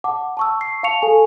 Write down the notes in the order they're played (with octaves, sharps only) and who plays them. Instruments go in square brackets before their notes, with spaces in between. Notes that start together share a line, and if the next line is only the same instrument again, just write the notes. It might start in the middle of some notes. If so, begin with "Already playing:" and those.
[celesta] F#5 A5 D6
A5 C#6 E6
C7
F5 A5 C#6 C#7 F7
A4 G#5